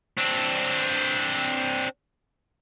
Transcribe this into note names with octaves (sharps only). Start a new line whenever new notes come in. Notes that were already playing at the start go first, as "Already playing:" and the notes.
C4 D4